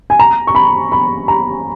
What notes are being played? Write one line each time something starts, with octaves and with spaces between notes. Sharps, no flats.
G#5
A#5
C#6
B5
B5
A#5